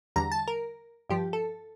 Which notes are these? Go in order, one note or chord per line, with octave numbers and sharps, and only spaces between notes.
E2 D3 G3 A#5
A5
A#4
G2 F3 G4
A4